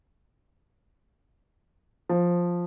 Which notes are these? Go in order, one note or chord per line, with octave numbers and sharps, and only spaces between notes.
F3